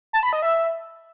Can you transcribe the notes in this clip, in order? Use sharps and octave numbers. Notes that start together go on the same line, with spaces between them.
A5
B5
D#5
E5